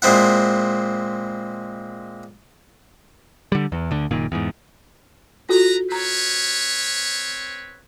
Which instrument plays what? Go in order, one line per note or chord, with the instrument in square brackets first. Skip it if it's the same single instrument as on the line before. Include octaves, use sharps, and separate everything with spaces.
[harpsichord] A#2 G#3 C4 E4 F#5
[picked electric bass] D3 G3
E2
D2 D3
F#1 A#2 D#3
E2 G#2
[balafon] F4 F#4 A4 [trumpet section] B4 A#5
[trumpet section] C4 B4 C#5 [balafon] A#5